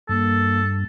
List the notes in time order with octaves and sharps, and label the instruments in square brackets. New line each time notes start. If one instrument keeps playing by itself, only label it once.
[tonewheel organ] G2 [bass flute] A#3 [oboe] A4